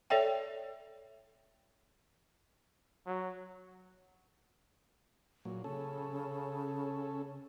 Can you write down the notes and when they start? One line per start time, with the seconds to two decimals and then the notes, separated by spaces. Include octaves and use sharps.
0.10 A4 C#5 D5 E5 G5
3.06 F#3
5.45 A#2 F#3
5.64 C#3 C#4 A4